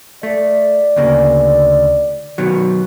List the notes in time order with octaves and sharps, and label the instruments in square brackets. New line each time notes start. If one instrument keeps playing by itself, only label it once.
[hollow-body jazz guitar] A3 [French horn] D5
[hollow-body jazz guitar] D2 C#3 A#3
B2 D#3 F#3